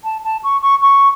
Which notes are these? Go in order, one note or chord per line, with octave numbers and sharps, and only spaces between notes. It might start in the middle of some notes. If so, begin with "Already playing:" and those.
A5
A5
C#6
C#6
C#6